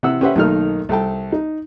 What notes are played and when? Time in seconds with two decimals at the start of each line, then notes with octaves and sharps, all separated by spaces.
0.03 C3 E3 F#5 E6
0.21 C#4 G4 B4 C5 E5 F#5
0.36 B1 D#3 A3 A#3 D#4 F6
0.89 C2 A4 G5 A5
1.32 D#4